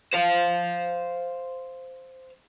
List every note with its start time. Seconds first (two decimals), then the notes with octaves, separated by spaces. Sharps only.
0.14 C5 F5